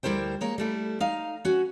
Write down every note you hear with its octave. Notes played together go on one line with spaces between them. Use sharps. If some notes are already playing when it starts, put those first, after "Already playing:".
D2 G3 E4 A#4 C5 G5
G#3 A#3 A#4 C#5
G3 A3 E4
D#4 F5
C#4 F#4